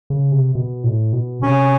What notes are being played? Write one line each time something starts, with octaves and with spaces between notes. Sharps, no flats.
C#3
C3
B2
A2
B2
C3 C#4